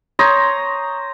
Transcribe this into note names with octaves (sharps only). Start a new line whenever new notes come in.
C5 C#5 A#5 D#6